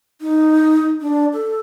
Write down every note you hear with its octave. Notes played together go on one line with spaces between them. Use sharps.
D#4
D4
A4